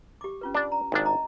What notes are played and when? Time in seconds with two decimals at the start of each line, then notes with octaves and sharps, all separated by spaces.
0.21 G4 D6
0.41 C#4 F4 B4
0.55 D4 D5
0.72 A#5
0.92 G#1 D4
1.05 D#5 A#5